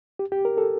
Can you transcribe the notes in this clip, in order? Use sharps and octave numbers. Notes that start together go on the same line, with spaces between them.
G4
G4
A#4
A4